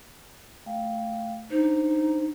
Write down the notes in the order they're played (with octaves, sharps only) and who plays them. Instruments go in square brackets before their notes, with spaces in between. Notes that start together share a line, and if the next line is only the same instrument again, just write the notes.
[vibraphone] A3 F5 G5
[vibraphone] D4 C5 [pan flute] D#4